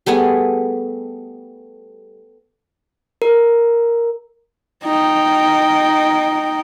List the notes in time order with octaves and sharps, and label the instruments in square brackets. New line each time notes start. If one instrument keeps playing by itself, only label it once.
[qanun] G3 A3 B3 G#4
[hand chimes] A#4
[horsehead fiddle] D#4 G5